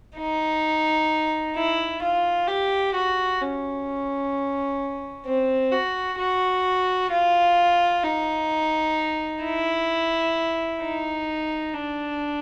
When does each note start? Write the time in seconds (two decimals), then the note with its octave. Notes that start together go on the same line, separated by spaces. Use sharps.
0.17 D#4
1.56 E4
2.02 F4
2.48 G4
2.95 F#4
3.42 C#4
5.26 C4
5.72 F#4
6.19 F#4
7.11 F4
8.04 D#4
9.44 E4
10.82 D#4
11.74 D4